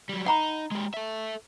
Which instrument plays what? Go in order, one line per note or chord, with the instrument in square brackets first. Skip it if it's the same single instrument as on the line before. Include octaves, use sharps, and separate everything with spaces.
[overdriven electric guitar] F#3 G3
[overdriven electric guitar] D#4 [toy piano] F#5 A#5 B5
[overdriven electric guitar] G#3 G4
A4 E5